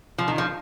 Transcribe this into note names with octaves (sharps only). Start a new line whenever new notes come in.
F3
D#3
F3